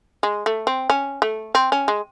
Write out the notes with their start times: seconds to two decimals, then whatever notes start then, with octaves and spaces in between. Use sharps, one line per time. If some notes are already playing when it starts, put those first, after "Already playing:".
0.23 G#3
0.46 A3
0.67 C4
0.90 C#4
1.22 A3
1.55 C4
1.72 C#4
1.88 G#3